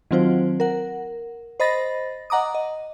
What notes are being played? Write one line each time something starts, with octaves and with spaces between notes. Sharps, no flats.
D#3 F#3 C4 F4 C5
A#4 F#5
C5 D#5 B5 A6 A#6
D#5 F#5 A#5 D6 D#6
D#5